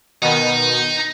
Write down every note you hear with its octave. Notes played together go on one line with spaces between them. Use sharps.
B2 D#3 B3 D#4